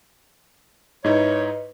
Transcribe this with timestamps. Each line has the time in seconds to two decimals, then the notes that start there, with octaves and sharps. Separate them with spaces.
1.04 G#2 D#4 E4 B4 C#5 D#5